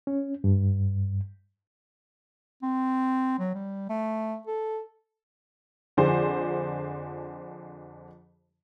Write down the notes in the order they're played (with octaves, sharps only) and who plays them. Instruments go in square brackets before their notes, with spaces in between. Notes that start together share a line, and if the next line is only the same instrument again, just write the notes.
[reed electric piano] C#4
G2
[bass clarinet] C4
F#3
G3
A3
A4
[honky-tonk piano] F2 D3 F3 G#4 C5